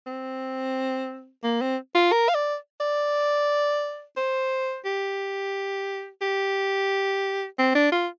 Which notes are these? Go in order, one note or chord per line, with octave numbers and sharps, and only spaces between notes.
C4
A#3
C4
F4
A#4
F5
D5
D5
C5
G4
G4
C4
D4
F4